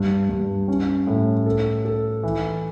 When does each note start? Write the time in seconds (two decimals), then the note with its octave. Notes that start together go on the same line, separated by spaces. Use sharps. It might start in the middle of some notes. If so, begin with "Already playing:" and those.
Already playing: G2
0.30 G2
0.68 C#4
1.07 A2
1.46 A4
1.85 A4
2.23 E3